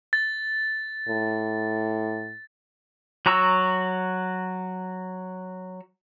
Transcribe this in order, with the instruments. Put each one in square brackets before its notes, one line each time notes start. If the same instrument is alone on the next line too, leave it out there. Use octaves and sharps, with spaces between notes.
[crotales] A6
[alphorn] A2
[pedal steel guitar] F#3 F#4 A#5 C#6 E6